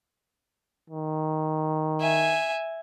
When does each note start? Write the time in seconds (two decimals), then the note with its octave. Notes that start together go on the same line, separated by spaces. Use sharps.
0.90 D#3
2.01 E5 G#5